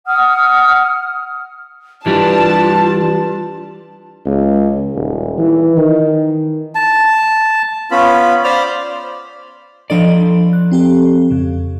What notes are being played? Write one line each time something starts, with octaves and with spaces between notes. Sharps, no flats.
F#5 D#6 F6
E3 G3 D4 F4 G4 B4 A5
C#2
D#1
E3
D#3
A5
B3 C#4 F4 B5
C5 D5 F5 B5 F6
F3 D4 A4 D5 D#5
F#6
C4 G4 A4
F2 C#3